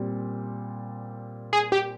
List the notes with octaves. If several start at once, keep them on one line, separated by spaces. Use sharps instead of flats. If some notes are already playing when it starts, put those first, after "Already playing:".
Already playing: A#2 G3 C4
G#4
G4